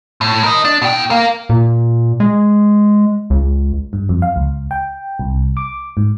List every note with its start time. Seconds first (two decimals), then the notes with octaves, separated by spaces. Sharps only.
0.21 A2
0.43 A#4 D#5
0.65 D4
0.82 B2 G5
1.10 A#4 F5
1.49 A#2
2.20 G#3
3.30 C#2
3.93 G2
4.09 F2
4.22 F5
4.36 C#2
4.71 G5
5.19 C2
5.57 D6
5.97 G#2